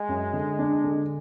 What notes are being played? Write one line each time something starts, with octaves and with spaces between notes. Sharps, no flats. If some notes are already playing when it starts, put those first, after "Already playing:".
Already playing: G#3
F#2
D3
D4
D3